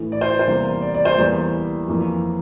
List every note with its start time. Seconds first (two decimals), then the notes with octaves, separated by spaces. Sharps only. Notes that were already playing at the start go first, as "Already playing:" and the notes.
Already playing: A2 E3 A3
0.12 D5
0.21 C5
0.39 C5
0.47 E2 C3 G3 A#3
0.82 D5
0.94 D5
1.05 C5
1.17 E2 E3 G3 A#3
1.88 F2 E3 A#3